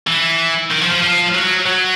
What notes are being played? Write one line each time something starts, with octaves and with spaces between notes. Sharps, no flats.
E3
D#3
F3
F3
F3
F#3
F#3